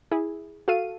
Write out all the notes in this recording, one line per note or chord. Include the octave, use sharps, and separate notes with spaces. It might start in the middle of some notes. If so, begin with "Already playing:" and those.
E4 G#4
F#4 A4 F5 D#7